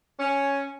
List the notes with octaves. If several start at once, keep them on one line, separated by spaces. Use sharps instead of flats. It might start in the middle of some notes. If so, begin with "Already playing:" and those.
C#4